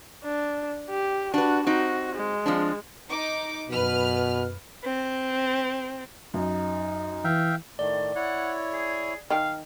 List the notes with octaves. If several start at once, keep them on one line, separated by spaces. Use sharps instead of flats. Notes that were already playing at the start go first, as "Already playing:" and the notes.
D4
G4
D4 F#4 B4
C4 D#4 F#4
G#3
F3 C4 D4
D#4 D6
F#2 B2 B4 F6
C4
F#2 D#4
E3 E5 F5 G5
A2 D#3 A3 D5
E4 C#5 F#5
G#4
D#3 D#4 F5 G5